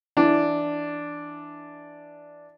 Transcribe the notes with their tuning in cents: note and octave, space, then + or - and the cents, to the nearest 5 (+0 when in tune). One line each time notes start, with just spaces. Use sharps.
E3 +0 D4 +0